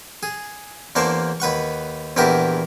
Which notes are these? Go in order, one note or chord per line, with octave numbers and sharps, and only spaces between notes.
G#4
E2 A#3 D4 C5 A5 C#6
D#2 B4 F#5 C#6
A#1 E2 B3 G4 A#4 E5